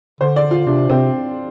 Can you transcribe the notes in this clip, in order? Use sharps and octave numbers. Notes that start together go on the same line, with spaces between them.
D3 C5
D5
F4
C3 D4
C3 C4